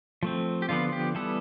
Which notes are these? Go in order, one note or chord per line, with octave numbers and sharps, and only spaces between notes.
F3 A3 C4
G4
D3 F3 B3 F4
G4
E3 G3 B3 A4